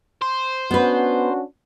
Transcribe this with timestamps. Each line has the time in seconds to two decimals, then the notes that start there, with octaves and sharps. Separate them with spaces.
0.22 C5
0.71 B3 C#4 D4 F#4 B4